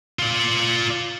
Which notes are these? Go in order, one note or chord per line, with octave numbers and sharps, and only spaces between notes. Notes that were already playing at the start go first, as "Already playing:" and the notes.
F4 D5